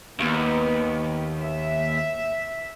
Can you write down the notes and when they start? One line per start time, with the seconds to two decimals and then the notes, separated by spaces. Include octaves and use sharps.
0.20 D#2 B3
1.41 E5